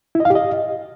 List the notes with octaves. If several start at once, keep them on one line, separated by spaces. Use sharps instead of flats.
E4
D#5
F5
G4
D#5